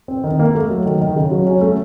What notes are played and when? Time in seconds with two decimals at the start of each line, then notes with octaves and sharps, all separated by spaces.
0.08 C4
0.24 D#3
0.39 A#3
0.55 A3
0.70 F#3
0.86 D#3
1.01 D#3
1.16 C#3
1.31 F#3
1.46 C#4
1.61 A3